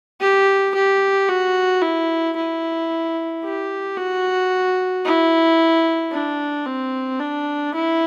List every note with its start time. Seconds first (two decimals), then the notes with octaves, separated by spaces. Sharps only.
0.21 G4
0.75 G4
1.29 F#4
1.82 E4
2.36 E4
3.43 G4
3.97 F#4
5.05 E4
6.12 D4
6.66 C4
7.20 D4
7.74 E4